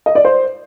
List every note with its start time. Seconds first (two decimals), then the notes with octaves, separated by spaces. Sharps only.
0.06 D#5
0.15 D5
0.25 C5